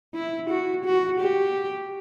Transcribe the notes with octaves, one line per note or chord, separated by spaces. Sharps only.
E4
F#4
F#4
G4